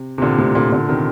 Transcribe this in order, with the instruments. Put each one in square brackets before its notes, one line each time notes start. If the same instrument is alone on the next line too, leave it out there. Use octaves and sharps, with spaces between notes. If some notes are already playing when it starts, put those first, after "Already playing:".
Already playing: [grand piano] C3
C3
A#2 D3
A2 C3
A#2 D3
A#2 D3
C3 D#3